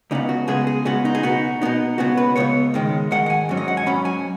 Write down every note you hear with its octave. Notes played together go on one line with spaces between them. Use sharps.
C#2 C#3 B3 D#4
F#4
C#3 G#3 B3 G#4
G#4
C#3 G#3 B3 F#4
D#4
G#4
B2 B3 D#4 F#4
B2 B3 D#4
C#2 C#3 B3 F#4
B4
C#2 C#3 B3 C#5
G#2 D#3 G#3
G#2 D#3 G#3 F#5
F#5
G#5
G#2 F#3 C#4
D#5
F#5
G#5
G#2 F#3 C#4 B5
G#5